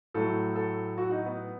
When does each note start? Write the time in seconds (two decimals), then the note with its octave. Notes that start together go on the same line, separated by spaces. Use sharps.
0.14 A2 F#3 A3 A4
0.56 A4
0.98 F#4
1.11 D#4
1.25 B3